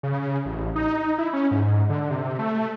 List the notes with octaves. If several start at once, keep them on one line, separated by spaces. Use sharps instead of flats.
C#3
A1
D#4
E4
C#4
G#2
D3
C3
A3